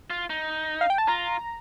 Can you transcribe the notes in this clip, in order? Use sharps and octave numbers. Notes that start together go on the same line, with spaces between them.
F4
D#4
F5
G5
A5
F4 A#5